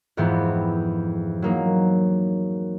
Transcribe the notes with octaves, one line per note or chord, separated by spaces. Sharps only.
F2 G#2 E3 B3 C4
F#3 A#3 D#4